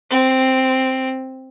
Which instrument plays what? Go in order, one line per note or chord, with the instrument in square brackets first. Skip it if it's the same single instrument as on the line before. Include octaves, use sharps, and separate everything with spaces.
[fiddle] C4